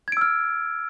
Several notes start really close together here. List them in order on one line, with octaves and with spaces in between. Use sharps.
G#6 D7 E6 F6